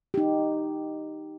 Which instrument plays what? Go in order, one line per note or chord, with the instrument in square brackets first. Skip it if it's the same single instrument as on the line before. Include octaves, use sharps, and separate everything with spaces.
[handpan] D#4 G4